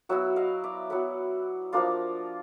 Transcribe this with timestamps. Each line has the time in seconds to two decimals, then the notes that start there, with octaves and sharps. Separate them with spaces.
0.09 F#3 B3 E4 E5 F#5
0.36 D#5 F5
0.64 D5 E5
0.90 F#3 B3 E4 E5 F#5
1.73 F3 A#3 D4 F4